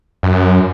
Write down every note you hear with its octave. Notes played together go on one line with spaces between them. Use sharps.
F#2